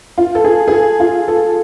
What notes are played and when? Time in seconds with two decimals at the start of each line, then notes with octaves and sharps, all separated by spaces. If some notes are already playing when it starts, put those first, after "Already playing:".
0.18 F4
0.35 A4
0.44 G#4
0.68 G#4
0.72 A4
1.00 F4
1.28 A4